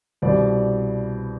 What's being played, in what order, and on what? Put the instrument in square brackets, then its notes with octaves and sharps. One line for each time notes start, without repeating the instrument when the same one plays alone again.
[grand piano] C2 B2 G3 C5 D5